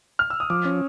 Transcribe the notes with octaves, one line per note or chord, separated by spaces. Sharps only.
F6
E6
D#6
F3 D6
C#4